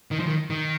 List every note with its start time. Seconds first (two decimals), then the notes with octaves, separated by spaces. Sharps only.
0.11 D#3
0.20 F3
0.27 D#3
0.50 D#3